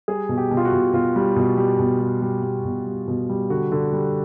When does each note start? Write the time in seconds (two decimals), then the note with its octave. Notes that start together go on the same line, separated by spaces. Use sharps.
0.08 G3 G#4
0.29 B2
0.37 G4
0.51 B2
0.57 F4
0.65 F#4
0.73 B2
0.93 B2 F4
1.16 G3
1.36 B2
1.57 G3
1.79 B2
2.01 G3
2.22 G3
2.43 G3
2.65 B2
2.86 G3
3.08 B2
3.29 G3
3.50 D3 F#4
3.72 D3
3.93 G3